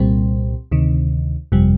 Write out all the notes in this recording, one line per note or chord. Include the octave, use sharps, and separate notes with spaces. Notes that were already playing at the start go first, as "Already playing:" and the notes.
Already playing: C2 A#2 G3 C4
D2 C3 D#3
G1 F2 C3 G3